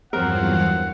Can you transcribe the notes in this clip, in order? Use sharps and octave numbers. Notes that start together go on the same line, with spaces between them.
E2 G2 F3 F#3 C4 A#4 F5 F#5